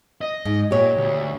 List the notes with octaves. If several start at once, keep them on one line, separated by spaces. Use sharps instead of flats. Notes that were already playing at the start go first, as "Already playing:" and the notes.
D#5
G#2
A#2 G4 C#5
D2